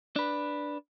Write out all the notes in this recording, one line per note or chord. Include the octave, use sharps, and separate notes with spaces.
D4 B4